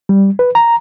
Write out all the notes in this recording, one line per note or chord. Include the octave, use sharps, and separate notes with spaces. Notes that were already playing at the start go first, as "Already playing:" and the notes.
G3
B4
A#5